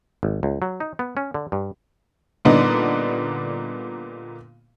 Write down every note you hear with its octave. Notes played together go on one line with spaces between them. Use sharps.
G#1
C#2
F#3
D#4
B3
C#4
D3
G2
A#2 D3 G3 B3 D4 D#4